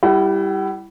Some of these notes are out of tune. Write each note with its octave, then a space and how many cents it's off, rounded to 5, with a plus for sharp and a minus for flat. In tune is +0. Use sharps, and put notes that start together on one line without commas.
G3 +0 E4 +15 F#5 +45